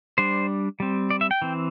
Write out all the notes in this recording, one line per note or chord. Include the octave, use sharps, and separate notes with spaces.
G3 D4 C5
G3 C4
D5
E5
G5
E3 C4